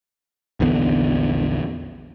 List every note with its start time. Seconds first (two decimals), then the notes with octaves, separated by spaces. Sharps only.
0.60 A#1 E2 D3 B3